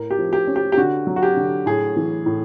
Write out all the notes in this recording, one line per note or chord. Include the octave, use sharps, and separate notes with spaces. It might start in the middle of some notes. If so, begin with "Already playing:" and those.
Already playing: A2 A#4
G4
F3
G4
C#4
G4
G4
D3 F#4
F#3
F#4
G4
D3
A2 G#4
E3
A2